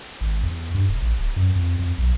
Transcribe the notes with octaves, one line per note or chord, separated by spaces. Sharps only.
G#1
E2
G2
E1
A1
D1
F#2
F2
F2
B1